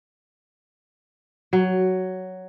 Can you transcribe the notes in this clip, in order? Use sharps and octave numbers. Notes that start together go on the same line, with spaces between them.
F#3